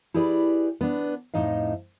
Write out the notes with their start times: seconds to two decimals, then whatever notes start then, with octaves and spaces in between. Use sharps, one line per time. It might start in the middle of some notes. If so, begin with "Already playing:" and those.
0.14 E4 G4 G#4 B4 D5
0.81 B3 D4
1.34 F2 A2 D#4 D#5 F5